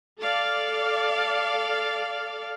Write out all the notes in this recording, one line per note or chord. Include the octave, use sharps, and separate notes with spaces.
A4 D5 F5